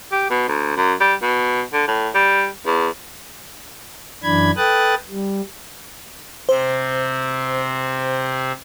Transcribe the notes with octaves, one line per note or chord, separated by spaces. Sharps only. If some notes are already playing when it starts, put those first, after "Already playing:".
G4
B2
D2
F#2
G3
B2
D3
A2
G3
E2
F#2 E3 D4 B5 G#6
A4 B4 G5 D#6 F#6 A6
G3
C3 C4 C5